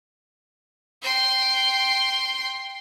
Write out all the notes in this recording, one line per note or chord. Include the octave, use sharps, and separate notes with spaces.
G5 C6